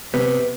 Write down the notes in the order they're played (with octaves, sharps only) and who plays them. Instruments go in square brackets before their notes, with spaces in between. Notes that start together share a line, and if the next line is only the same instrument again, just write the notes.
[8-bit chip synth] C3 [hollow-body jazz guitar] B3